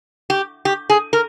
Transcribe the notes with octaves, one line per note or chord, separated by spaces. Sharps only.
G4
G4
G#4
A#4